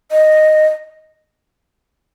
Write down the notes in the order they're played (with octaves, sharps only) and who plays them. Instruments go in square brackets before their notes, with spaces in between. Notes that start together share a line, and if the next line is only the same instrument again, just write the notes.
[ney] D#5